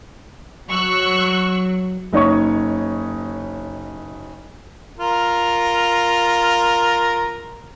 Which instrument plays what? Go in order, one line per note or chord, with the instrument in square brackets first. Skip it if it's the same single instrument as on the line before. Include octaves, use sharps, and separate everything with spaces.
[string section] F#3 [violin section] C#6 E6 F#6
[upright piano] F#1 D#4 C#5 C#6
[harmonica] F4 A#4